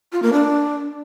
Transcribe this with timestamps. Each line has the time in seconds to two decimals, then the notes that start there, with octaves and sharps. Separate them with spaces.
0.12 F4
0.22 A#3
0.33 D4